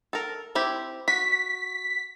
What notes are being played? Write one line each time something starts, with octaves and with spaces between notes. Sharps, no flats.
A4 A#4
C4 E4 G4
F#4 B6